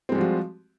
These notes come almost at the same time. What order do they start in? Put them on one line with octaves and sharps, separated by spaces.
C4 G#3 G3 F3 F#4